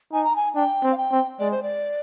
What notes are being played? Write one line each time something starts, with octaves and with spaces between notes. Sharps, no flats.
D#4 G#5
A#5
G#5
D4 G5
C4
F5
G5
C4
G#3 D5
C5
D5